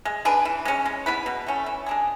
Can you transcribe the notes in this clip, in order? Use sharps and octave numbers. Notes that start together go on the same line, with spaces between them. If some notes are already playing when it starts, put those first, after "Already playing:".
G#3
D4 G#4 B4
E3
G#3 C#4
G#3
B3 E4 B4
B2
A3 C#4
E3
G#3 D4 G#4